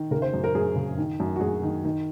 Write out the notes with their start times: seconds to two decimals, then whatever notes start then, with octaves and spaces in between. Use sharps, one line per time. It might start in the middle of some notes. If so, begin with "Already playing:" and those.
Already playing: D#3
0.11 C#3 A#4
0.22 C5
0.33 F#2
0.44 A#4
0.55 F#2 G#4
0.76 C#3
0.98 D#3
1.20 F#2
1.36 F#4
1.40 F#2 G#4
1.63 D#3
1.85 D#3